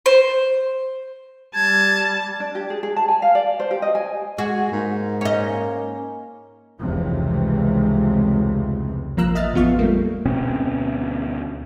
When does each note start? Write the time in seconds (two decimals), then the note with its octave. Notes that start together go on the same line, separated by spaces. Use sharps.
0.06 C5
1.55 G3 A5 G#6
2.40 D4
2.55 G4
2.70 G#4
2.83 G#4
2.96 A5
3.08 G#5
3.22 F5
3.35 D5
3.60 C5
3.71 G4
3.82 D#5
3.95 G#5
4.38 G#3 F#4 G#4
4.72 G#2 A#3
5.21 C#4 D#5
6.79 F1 C#2 C3 E3
9.17 A1 F3 A#3 A#5 E6 F#6
9.35 D#5 E5 F6 A6
9.54 A1 F2 B3 F4 F5 C#6
9.79 G3 A3 A#3
10.25 D2 B2 C4 C#4